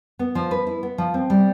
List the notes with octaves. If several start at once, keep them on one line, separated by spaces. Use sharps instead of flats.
B3
F3
B4
E4
B3
F3
C4
G3